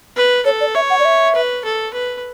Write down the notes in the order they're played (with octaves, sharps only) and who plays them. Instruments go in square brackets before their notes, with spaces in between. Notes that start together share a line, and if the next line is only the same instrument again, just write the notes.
[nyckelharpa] B4
[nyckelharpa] A4 [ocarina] C#5
[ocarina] D5
[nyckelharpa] C#5 [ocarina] E5
[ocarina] F#5
D5
E5
[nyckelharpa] B4
A4
B4